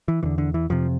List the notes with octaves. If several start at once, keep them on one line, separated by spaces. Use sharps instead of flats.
E3
E2 D3 E3
D3
E3
F2 C3 F3